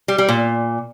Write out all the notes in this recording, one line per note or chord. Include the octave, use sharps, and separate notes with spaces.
G3
G3
A#2